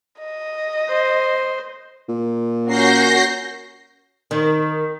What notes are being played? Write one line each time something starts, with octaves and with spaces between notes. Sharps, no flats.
D#5
C5
A#2
C#4 F#4 A#4 G6 A#6 C7
D#3